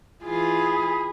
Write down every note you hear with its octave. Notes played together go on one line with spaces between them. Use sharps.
E3 F4 G#4 B5